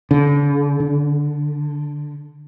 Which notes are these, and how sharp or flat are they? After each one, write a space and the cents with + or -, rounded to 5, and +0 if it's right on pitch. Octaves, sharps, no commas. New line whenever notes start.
D3 -40
D3 +0